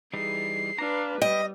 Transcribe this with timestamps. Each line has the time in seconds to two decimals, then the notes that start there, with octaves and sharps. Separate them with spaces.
0.14 E3 G3 D#4 G#4 C7
0.79 D4 B4 F5 A#5
1.22 G3 B4 D#5 G5